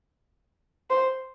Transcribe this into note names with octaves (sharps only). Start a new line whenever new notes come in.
C5